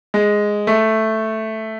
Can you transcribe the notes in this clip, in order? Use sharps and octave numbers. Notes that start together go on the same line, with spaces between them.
G#3
A3